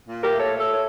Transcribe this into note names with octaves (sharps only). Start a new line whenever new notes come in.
A#2
G4 A#4
A3
A4 C#5
A3 A4 C#5
C#5